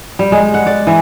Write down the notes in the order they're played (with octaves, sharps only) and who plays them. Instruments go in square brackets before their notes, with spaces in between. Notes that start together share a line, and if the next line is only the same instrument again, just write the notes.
[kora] G3
G#3
F#5
D5
E3